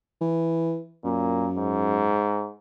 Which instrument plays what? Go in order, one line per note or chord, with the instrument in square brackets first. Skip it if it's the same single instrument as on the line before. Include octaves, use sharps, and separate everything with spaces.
[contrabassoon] E3
[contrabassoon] F#2 [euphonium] A#2
[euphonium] G#2